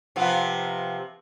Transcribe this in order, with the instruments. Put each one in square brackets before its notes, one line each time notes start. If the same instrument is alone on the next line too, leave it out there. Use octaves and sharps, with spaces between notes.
[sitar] C3 F3 B3